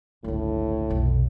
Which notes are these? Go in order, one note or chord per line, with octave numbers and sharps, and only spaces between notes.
G1 C#2 A2
F1 B1